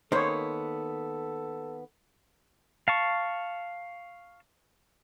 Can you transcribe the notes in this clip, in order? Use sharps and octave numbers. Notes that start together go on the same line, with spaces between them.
D#3 A#3 B3 A4 C5 C#5
F5 A5 C#6